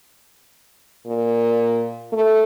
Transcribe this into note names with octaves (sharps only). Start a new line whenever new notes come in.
A#2
A3